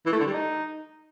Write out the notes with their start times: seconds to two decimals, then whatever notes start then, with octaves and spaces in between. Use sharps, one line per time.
0.06 E3
0.13 A3
0.20 D3
0.27 G3
0.33 D#4